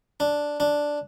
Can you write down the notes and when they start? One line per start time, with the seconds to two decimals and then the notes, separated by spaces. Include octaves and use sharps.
0.20 D4
0.60 D4